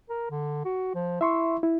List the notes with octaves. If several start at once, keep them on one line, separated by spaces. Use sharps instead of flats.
A#4
D3
F#4
F3
E4 E5 C6 C#6
E4